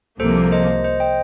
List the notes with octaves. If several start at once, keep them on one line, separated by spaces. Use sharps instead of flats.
C2 C3 F3 A#3 A4 C5
C5 D#5
C5 D#5
D#5 G5